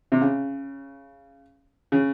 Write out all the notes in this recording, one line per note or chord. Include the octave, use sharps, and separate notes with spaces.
C3
C#3
C#3